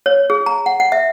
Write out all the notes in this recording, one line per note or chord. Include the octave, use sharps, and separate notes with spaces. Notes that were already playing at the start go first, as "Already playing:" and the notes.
C#5
G#4
A#5
F#5
F#5
E5